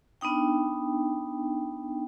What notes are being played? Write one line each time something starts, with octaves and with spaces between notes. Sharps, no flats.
B3 D4 D#4 G5